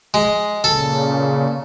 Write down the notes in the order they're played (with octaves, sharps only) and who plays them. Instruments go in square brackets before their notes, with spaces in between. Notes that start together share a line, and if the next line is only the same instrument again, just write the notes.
[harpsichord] G#3
[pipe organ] A#2 C#3 [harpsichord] A4